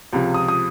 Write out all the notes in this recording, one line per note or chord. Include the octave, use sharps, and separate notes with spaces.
C#2 C3 F3
D#6
D#6